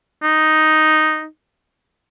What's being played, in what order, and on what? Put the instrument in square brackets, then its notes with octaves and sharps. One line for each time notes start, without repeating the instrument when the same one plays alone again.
[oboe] D#4